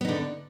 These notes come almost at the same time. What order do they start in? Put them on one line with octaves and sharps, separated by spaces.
B3 D#4 D3